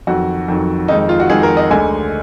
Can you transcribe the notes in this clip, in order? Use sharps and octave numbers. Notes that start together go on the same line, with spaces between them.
F2 D#3 F#3 F#4
F2 D#3 F#3
F2 D#3 G#3 D#4
F4
F#4
F2 D#3 G#3 G#4
A#4
D#5
D2 D3 G#3 G#5